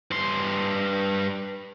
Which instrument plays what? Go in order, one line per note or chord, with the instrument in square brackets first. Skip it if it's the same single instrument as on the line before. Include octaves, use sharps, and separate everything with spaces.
[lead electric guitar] G2 C6